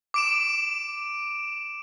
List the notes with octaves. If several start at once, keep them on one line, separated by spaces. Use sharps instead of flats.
D6 D7 E7